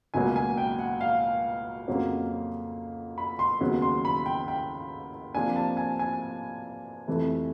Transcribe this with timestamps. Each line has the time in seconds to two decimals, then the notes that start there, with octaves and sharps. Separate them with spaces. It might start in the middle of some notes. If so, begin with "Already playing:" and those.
0.14 C#2 B2 F#3 A#3 G#5
0.36 G#5
0.58 G5
0.79 F#5
1.01 F5
1.88 F2 C#3 F#3 A#3 C#4
3.18 B5
3.39 C6
3.61 D#2 C#3 F#3 B3
3.82 C6
4.05 B5
4.26 G5
4.48 G5
5.34 C3 F3 A#3 D4 G#5
5.56 A5
5.77 G#5
5.99 G#5
7.08 F2 C3 E3 A3